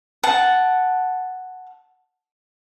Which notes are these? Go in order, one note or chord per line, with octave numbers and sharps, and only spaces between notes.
F#5 A5